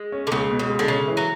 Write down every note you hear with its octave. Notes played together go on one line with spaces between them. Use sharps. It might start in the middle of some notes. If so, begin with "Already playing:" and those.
Already playing: G#3
C#4
D3
C#2 C#3
B2
C#3
G#3
D3
C#3 C#4
E3
F#3